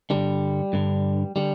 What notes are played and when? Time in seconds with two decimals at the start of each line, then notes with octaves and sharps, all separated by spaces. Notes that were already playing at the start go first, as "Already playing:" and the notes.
0.10 G2 D3 G3
0.73 G2 D3
1.36 D3 G3